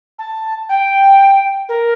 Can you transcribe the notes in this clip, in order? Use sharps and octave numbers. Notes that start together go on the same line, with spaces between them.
A5
G5
A#4